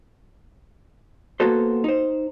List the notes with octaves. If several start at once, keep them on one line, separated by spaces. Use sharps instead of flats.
A#3 B3 F#4 A4 C5
D#4 C5